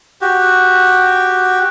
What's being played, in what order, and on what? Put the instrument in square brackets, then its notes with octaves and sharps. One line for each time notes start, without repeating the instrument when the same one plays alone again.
[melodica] F#4 G4